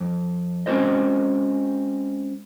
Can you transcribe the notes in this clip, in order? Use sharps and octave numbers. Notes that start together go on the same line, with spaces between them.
F2
G#3 C4 C#4 F#4 C5 D#5